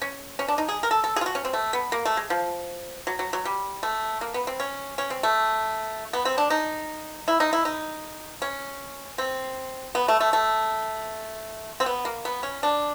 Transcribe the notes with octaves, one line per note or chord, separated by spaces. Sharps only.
C#4
C#4
D4
D#4
G#4
A#4
A4
A4
G#4
F4
F#4
C#4
C4
A3
B3
A#3
A3
G#3
F3
F#3
F#3
F#3
G3
A3
A#3
B3
C4
C#4
C#4
C4
A3
B3
C4
D4
D#4
E4
D#4
E4
D#4
C#4
C4
B3
A3
A3
A3
C4
B3
A#3
B3
C#4
D4